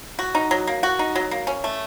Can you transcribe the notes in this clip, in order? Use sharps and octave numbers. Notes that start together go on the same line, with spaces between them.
F#4
D#4
F#3
A#3
F#4
D#4
F#3
A#3
C#4
A3